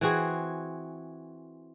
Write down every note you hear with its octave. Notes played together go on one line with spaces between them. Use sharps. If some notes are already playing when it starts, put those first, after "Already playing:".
E3 C4 F#4 G#4